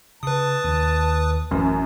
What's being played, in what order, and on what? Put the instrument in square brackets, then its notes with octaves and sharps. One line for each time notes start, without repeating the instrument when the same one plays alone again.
[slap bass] C#3 [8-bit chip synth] B4 D#6 [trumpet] A5
[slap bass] D#2
[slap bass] A1 [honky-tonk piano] F#2